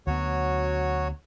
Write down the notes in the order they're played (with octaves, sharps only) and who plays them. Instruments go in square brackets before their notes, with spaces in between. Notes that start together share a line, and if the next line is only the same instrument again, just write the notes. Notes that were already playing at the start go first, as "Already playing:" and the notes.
[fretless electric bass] D2 B3 [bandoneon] F#3 F#4 C#5